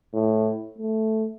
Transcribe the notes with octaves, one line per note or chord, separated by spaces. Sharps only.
A2
A3